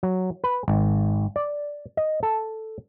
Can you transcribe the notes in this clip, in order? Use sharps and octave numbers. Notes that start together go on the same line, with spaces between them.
F#3
B4
G#1
D5
D#5
A4